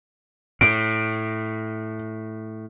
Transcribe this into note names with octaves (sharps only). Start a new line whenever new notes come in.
A2 D7